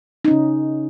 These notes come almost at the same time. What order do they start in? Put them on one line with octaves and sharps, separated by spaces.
D#4 C#4 C#3